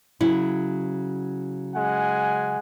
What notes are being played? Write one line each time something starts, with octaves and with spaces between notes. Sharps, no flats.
C#3 F#3 E4
G#3 F#5 G#5